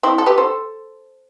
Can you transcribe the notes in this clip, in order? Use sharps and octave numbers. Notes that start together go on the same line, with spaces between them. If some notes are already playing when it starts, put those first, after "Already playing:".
C4 E4
A4
G4 B4
A4 C5